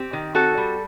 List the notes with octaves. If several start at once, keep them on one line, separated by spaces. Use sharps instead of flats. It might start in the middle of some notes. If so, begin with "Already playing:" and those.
Already playing: C4 G4
D#3
C4 F#4 A4
G3